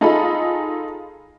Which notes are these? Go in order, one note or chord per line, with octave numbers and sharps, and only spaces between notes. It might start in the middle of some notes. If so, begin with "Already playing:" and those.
D#4 F4 G#4 A4 D#5 B5